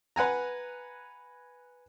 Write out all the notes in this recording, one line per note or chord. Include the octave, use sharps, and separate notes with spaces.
B4 F#5 G#5 A#5